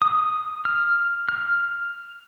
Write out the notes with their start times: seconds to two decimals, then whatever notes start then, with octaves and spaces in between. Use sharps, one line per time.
0.02 D#6
0.65 F6
1.29 F6